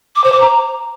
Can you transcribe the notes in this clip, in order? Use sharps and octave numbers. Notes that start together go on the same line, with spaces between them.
D6
C5
D6
A#5